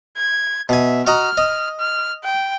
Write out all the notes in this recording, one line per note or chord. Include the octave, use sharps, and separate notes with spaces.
G#6
B2 E5 G#5
F#4 D#5 A#5 F6
D#5
F6
G5